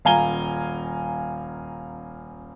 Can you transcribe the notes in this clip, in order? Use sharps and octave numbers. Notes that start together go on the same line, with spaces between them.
D#1 F5 G#5 A#5 G7